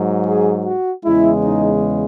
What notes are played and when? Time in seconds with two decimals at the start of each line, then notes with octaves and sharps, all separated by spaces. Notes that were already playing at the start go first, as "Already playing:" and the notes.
Already playing: G#2 F#3
0.26 G#4
0.65 F#4
1.04 E2 C#3 G#3 E4
1.44 D#4